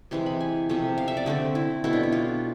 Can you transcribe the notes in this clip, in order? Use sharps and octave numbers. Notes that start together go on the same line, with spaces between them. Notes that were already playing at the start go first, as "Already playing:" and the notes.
C3 E3 G#3 C6
B5
G#5
C3 F3 A3
F5
E5
D5
D3 A3 C4
E4
B2 A3 C4 E4
D4
E4
F4